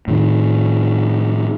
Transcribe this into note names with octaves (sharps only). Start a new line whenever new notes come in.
A2 D#3